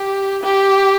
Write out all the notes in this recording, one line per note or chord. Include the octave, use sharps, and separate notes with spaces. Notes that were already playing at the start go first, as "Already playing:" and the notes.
Already playing: G4
G4